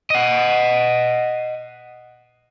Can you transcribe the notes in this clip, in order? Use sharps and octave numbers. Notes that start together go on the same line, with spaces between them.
D#5 F#5